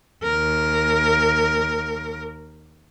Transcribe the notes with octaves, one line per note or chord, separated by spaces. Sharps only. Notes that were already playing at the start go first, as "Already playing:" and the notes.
D#2 A#4